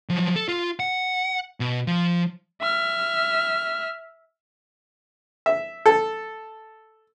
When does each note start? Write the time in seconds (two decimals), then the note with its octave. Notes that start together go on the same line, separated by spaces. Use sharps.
0.09 F3 F#3
0.36 A4
0.49 F4
0.80 F#5
1.60 B2
1.87 F3
2.61 E5 F6
5.46 E5
5.86 A4